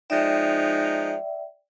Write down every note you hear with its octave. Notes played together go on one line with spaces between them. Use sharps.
F3 G#3 D#4 D5 E5 G5